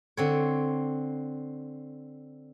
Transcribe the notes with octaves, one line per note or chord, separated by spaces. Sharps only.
D3 C4 C#5